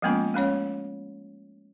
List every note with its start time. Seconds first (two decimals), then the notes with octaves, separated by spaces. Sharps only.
0.02 F3 G#3 A#3 B3 C#4 F4
0.34 G#3 A3 C#4 C#5